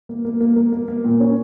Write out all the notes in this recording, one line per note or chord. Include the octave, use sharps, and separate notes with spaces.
A#3
A#3
A#3
A#3
A#3
A#3
A#2
C#4